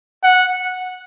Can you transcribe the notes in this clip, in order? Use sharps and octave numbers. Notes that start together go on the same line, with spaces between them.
F#5